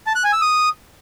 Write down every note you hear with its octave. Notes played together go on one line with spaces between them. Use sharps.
A5
F#6
G#5
E6
D#6